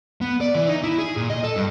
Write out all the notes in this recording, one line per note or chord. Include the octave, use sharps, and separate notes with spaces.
B3
D5
E3
D#4
E4
G#4
A#2
D#5
A4
G2